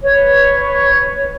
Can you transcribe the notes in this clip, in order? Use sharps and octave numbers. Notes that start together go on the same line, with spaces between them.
B4 C#5